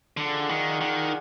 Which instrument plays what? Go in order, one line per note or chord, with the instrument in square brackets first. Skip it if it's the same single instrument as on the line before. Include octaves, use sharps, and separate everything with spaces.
[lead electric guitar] D3 [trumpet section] F4 G#4 D5 F#5
[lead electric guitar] D#3
D#3